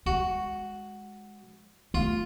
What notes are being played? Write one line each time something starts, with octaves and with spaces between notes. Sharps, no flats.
G#3 F#4
A3 F4